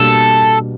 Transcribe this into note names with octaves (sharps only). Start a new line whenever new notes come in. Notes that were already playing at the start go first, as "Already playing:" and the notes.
Already playing: B2 G3 A#3 D4 A4